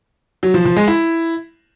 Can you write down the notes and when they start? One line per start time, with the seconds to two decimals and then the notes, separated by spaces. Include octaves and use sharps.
0.43 F#3
0.54 F3
0.65 F3
0.76 G#3
0.88 E4